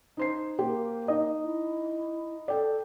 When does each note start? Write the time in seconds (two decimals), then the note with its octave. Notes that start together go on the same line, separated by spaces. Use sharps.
0.17 D#4 C5 C7
0.59 A#3 G4 C5 G5
1.08 D#4 D#5
1.44 E4
2.48 A4 D5 G5